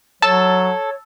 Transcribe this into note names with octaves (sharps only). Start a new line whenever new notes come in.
F#3 A4 C#5 A5